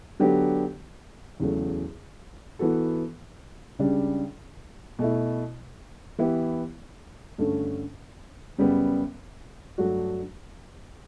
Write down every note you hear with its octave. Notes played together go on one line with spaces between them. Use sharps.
D3 F#3 B3 D4 G4
E2 C#3 F#3 A3
E3 B3 F#4 A4
C#2 C#3 G3 D4
B2 A3 E4
E3 B3 E4 G4
G2 D3 A3 C#4
F#2 C#3 G3 B3
G2 F#3 A3 D4 F#4